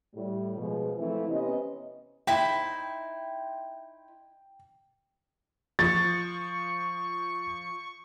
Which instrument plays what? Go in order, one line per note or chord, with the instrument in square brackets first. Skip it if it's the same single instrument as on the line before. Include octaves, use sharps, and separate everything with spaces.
[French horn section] A2 G3
B2 F3 G#3
E3 F3 A3 C4 E4
C3 B3 C#4 D#5
[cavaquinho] D#4 E4 C5 [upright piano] G5
[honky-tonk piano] F3 [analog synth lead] C#6 [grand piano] A6